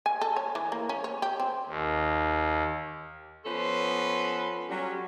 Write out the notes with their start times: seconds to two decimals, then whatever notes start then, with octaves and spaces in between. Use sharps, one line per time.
0.06 G#5
0.21 A4
0.36 C#5
0.55 E3
0.72 A#3
0.89 C#4
1.04 C#5
1.22 G4
1.40 C4
1.68 D#2
3.45 F3 B3 C#4 A4 B4 C6
4.69 F#3 G3 C#4